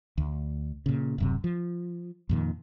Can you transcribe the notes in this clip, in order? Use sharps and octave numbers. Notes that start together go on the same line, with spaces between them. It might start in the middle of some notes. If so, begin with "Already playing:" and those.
D2
A#2 C#3
D1 F#2 C3
F3
F2 A#2 D#3